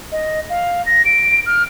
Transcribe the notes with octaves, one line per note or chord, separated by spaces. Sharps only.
D#5
F5
A#6
D7
F6